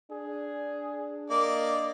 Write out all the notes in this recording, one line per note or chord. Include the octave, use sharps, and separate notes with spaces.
D4 G#4
A#3 D5 D#5 D6